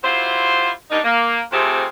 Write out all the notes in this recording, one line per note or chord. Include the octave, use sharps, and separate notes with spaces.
F#3 E4 F4 G4 C5
G3 A#3 D4 D#4
A#3
F2 C3 A3 C4 G4 G#4